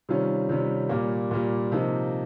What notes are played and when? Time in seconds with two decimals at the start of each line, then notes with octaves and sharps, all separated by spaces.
0.09 C3 D#3 G3 C#4 F4
0.49 C3 D#3 G3 C#4 F4
0.89 A#2 G3 A#3
1.31 A#2 G3 A#3
1.72 C3 F3 A#3 D#4